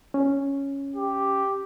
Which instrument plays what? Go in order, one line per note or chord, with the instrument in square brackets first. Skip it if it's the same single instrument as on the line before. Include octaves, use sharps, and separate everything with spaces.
[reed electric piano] C#4
[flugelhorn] G4